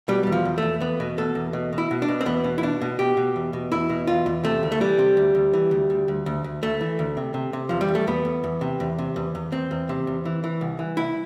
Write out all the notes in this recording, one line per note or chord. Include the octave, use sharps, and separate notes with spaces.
B2 G3
E2 G3
F3
E2
E2 A3
E2 B3
B2
B2 A4
E2
B2
B2
E4
B2
D4
B2
C4
E2 B3
B2
E4
B2 D4
B2
B2 G4
B2
E2
B2
E2 E4
B2
E2 F4
E2
C3 A3
D2
A3
E3 G3
C3
D2
D2
E3
D2
D2
D2
D2
D2
D2 A3
E3
D2
C3
C3
C3
E2 F3
G3
E2
A3
E2 B3
E2
E2
C3
E2
C3
E2
E2
E2 C4
E2
C3
E2
E3
E3
C2
E3
C2 E4